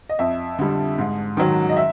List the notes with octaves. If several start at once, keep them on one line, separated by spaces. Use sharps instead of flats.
D#5
F2 E5
D3 G3
G#2
D#3 F#3
D#5
E5